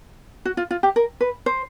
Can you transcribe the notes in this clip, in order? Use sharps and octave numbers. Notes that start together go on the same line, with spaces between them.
F#4
F4
F4
G4
A#4
B4
C5